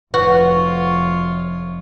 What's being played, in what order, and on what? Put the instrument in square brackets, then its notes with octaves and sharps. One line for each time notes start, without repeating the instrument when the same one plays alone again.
[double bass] F1 [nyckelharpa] F4 C#5 [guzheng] F#4 [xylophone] B4